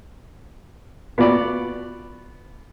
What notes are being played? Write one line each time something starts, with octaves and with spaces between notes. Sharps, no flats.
B3 F4 F#4 D5 B5